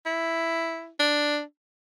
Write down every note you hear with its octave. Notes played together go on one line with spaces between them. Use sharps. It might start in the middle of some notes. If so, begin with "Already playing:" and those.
E4
D4